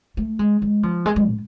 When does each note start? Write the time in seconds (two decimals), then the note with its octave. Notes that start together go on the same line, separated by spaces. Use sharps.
0.17 A3
0.39 G#3
0.62 G#3
0.83 F3
1.06 G#3
1.16 G#3
1.27 A2